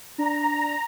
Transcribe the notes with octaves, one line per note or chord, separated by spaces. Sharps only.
D4 A#5